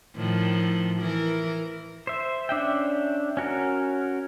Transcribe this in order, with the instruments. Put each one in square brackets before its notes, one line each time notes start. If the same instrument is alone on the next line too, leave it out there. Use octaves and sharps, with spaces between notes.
[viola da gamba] A2 D#3 F3
E3 A#4
[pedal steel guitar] C5 E5
C#4 D4 E5 G5
C#4 F#4 A#4